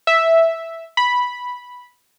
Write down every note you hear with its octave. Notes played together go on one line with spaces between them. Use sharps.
E5
B5